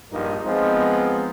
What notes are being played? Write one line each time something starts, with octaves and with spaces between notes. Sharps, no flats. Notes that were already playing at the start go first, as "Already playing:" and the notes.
A#1 G2 F3 D#4 A#4
F3 G#3 B3 C4 D#4